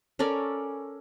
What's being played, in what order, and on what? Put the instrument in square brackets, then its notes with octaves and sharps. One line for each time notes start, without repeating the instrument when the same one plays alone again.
[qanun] C#4 A4 A#4 D5